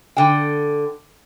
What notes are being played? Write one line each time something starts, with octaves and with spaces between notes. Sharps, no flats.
D3 G5